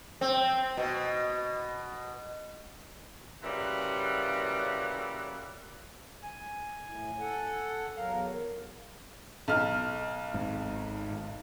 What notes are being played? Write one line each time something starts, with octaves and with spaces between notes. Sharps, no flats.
C4
B2
A#2 C#3 E3 G3 F#4
G#5
A2
A4 F#5
E2 F#3 A#4 F5
B1 F6
G#1 G#2